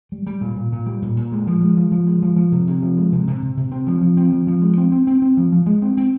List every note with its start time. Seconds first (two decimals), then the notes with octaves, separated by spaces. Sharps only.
0.12 G3
0.27 G3
0.41 A#2
0.56 A#2
0.72 A#2
0.86 G3
1.02 A#2
1.17 A#2
1.32 G#3
1.47 F3
1.62 G#3
1.77 F3
1.92 F3
2.07 G#3
2.22 F3
2.37 F3
2.52 C3
2.67 C3
2.82 F3
2.97 G#3
3.12 C3
3.27 C3
3.42 C3
3.57 C3
3.72 C4
3.87 F3
4.01 F3
4.17 C4
4.32 F3
4.47 F3
4.62 G#3
4.77 C4
4.92 C4
5.07 C4
5.22 C4
5.37 F3
5.52 F3
5.66 G#3
5.82 C4
5.97 C4